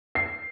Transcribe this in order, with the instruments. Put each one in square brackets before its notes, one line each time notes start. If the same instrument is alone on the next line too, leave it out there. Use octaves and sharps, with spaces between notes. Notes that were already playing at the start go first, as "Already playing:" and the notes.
[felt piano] C7